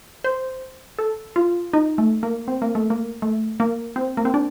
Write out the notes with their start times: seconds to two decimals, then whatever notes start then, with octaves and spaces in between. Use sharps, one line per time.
0.24 C5
0.99 A4
1.36 F4
1.73 D#4
1.98 A3
2.23 A#3
2.48 C4
2.62 A#3
2.75 A3
2.90 A#3
3.22 A3
3.60 A#3
3.96 C4
4.17 A#3
4.25 C4
4.34 D4